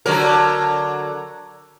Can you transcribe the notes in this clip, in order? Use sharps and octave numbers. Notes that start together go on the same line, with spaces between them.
D3 F#3 A#4